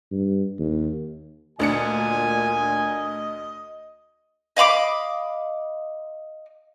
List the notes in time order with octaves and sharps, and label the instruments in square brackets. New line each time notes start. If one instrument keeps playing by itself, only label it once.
[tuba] G2
D#2
[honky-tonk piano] D2 D4 C#7 [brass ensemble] A#2 G#5 [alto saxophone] D#5
[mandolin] D#5 F5 B5 D6